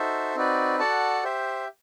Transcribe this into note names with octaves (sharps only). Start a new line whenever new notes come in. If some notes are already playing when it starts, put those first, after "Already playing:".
Already playing: D#4 F#4 A4 C5 E5
C4 D#4 F#4 B4 D5
F#4 A4 D5 F#5 A5
G4 C5 E5